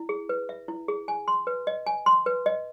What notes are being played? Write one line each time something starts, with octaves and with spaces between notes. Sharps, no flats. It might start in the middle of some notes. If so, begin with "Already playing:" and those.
Already playing: E4
G#4
B4
E5
E4
G#4
G#5
C6
B4
D#5
G#5
C6
B4
D#5